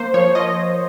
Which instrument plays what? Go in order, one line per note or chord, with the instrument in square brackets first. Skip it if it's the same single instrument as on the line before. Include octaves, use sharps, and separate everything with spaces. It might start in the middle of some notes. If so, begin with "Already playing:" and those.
Already playing: [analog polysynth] A#3 C5
F3 C#5
F3 D#5